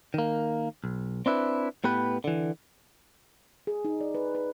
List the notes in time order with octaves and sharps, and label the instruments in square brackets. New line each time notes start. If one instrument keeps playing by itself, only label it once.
[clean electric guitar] D#3 A#3
B1
C4 D4 E4 B4
A2 B3 G4 B4
D3 E3
[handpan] G#4
D#4
D5
B4
B4